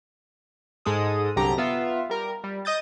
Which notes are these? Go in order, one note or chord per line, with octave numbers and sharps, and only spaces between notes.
G#2 G#3 A4 D#6
C2 F#2 D3 G4 A#5
B3 F4 E5
G3 A#4
G3
D#5 D#6 G6 A6